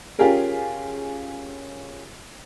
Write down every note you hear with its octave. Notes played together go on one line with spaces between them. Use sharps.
C#4 F4 G4 G#4 A#4